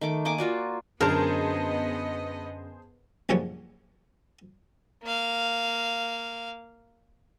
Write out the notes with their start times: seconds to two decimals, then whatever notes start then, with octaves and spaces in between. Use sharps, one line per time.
0.01 D#3 A3 D6
0.25 A#3 D#5 G#5 D6
0.38 F4 F#4 D5
1.01 F#2 D3 B3 G#4 A#4 C5 D#5 A5
3.29 A#1 F#2 C#3 F3 G3 C#5
5.03 A#3 F5